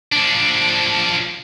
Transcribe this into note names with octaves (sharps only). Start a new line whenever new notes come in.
F3 D4